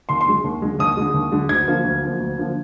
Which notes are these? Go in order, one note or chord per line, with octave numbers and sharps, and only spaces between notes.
D#2 C6
C6
D3 G#3
D#2
D3 G#3
D#2 D#6
D3 G#3
D#2
D3 G#3
D2 G#6
D3 F3 A#3
D2
D3 F3 A#3
D2
D3 F3 A#3